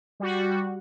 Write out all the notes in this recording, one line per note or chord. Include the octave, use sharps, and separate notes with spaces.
G3 F#4